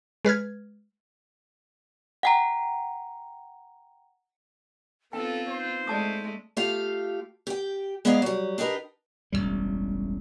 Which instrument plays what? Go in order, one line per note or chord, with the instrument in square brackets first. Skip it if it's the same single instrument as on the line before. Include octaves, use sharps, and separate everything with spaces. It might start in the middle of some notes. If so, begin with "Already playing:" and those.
[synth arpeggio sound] G#3 B4 F6 G#6
[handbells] F#5 G5 A#5
[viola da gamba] B3 C4 F4 [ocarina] D#4 [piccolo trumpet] A4 [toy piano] G5
[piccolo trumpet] C5
[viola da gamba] G#3 A3 [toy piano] D5 A5 D#6
[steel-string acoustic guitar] A3 F4 G4 F5
G4 G5
G#3 B3 D#4 G#4 D5 F5
F#3 G3
D4 D#4 G4 A#4 B4
[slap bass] E1 A1 E2 G3